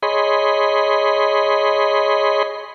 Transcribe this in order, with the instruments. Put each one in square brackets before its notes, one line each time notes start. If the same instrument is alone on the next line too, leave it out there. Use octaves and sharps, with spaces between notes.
[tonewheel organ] G#4 C#5 D#5 B5 C6